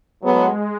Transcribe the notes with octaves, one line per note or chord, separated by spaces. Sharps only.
A2 F#3 G#3 B3